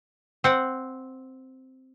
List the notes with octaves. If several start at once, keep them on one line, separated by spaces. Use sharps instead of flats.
C4 F#5